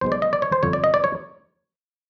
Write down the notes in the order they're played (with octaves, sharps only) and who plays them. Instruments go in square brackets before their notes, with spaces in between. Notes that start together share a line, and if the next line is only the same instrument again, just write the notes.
[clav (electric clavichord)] B1 B2 G#3 C5
D5
D#5
D5
C#5
C5
G1 F2 D3 C#5
D5
D#5
D5
C#5